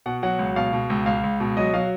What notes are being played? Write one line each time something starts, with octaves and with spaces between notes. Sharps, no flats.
B2 F#5
F#3 F#5
C#2
B2 F5
B2
C#2
C#2 F5
C#2
B2
F#3 D#5
F#3 F5